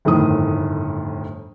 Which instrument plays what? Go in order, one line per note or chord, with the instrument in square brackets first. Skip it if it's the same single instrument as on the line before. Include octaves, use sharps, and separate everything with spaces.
[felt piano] G1 F2 A2 D#3 D#6